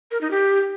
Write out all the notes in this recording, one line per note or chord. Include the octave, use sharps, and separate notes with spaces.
A#4
D#4
G4